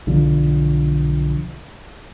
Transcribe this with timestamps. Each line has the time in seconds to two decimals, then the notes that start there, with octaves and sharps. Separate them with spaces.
0.07 B1 D3 F3